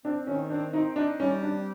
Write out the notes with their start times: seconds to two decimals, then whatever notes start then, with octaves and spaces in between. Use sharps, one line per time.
0.05 C4 D4
0.27 D#3 C#4
0.50 C4 D4
0.73 C4 D#4
0.96 D4 D#4
1.19 G3 C#4
1.43 C4 D4